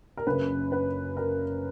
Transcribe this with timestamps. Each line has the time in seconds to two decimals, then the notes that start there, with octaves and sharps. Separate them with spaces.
0.17 A#4
0.27 F#1 F#2 C#3 B4
0.72 B4
1.17 A#4